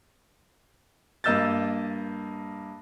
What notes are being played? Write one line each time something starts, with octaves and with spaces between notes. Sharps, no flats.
G2 A#3 D#5 E6 G6 A6